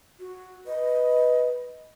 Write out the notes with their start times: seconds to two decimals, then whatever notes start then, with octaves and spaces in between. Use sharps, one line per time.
0.20 F#4
0.67 B4 D#5